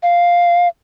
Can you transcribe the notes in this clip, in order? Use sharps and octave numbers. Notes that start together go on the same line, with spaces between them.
F5